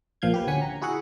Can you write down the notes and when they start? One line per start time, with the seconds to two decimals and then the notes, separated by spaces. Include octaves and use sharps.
0.22 A#1 A#2 F3 F5 G6 G#6
0.34 G4 B4
0.47 D2 C#4 F#5 G#5 B6 C#7
0.62 A#5
0.81 E4 F#4 G#4 E5 F#5